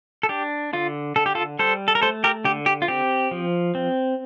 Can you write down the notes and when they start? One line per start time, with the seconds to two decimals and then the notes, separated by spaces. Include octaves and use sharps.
0.23 A4
0.29 D4 G4
0.73 D3 F4
1.16 D3 A4
1.26 G4
1.35 F4 A4
1.59 G3 A4 C5
1.88 A4
1.95 A#4
2.02 A3 A4 C5
2.24 G4 A#4
2.45 D3 G4
2.66 G4
2.82 F4
2.88 C4 G4
3.31 F3
3.75 C4